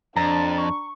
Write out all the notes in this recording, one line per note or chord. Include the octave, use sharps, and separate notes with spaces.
F2 D4 A#5 A6
C#6